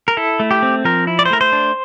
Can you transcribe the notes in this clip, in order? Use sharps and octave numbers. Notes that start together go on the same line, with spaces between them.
A#4
E4 A4
A3
G4
C4
F3 A#4
E4
D5
C5
A3 A#4
C5
D4